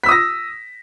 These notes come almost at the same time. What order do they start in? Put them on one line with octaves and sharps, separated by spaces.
B6 E6 D#6 A#6